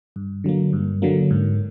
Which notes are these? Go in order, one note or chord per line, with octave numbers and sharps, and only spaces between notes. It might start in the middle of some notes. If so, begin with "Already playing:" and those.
G2
D3 F#3 A#3
G2
D3 F#3 A#3
G#2